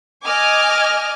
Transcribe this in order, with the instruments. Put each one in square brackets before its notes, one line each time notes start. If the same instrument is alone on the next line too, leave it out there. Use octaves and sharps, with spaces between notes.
[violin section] D#5 G#5 D6 F6